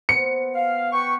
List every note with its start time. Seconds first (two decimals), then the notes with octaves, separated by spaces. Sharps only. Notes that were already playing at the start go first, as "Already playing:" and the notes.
0.09 B3 C5 C#7
0.55 F5
0.92 B4 G5 C#6